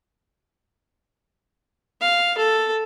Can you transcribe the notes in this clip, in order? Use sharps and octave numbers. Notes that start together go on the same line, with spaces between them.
F5
A4